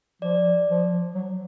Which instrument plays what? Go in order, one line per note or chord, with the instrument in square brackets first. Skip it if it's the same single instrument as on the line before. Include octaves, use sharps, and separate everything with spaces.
[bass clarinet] F3 [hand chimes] D5
[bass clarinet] F3
F#3